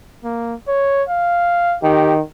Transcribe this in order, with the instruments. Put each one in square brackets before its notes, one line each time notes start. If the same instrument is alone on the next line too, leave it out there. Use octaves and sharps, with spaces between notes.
[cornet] A#3
C#5
F5
[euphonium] D#3 [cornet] G4